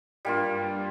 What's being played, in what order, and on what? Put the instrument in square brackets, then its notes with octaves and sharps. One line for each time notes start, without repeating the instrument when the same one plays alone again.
[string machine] G2 [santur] G3 A#3 F4